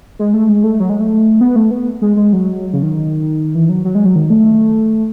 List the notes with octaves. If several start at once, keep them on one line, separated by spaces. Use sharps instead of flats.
G#3
A3
G#3
A3
F#3
G#3
A3
B3
A3
B3
G#3
G#3
F#3
C#3
D#3
E3
F#3
F#3
G#3
F#3
D#3
A3